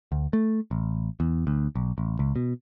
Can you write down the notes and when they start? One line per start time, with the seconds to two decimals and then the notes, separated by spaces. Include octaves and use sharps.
0.12 D2
0.33 A3
0.71 A1
1.20 E2
1.47 D2
1.75 B1
1.98 A1
2.19 C#2
2.36 B2